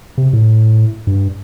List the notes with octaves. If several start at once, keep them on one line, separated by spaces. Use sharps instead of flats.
C3
A2
G2